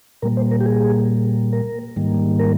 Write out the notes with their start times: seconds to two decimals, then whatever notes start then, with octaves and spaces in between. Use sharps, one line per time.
0.22 A#2 G3 A#3 A#4
0.37 C5
0.51 A#4
0.60 G4
0.66 G#4
1.53 A#4
1.96 G#2 D#3 G3 A#3
2.40 A#4